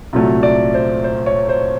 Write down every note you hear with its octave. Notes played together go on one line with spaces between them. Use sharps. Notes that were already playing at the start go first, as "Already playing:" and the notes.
C2 A#2 F#3 A3
D5
C5
C5
C#5
C5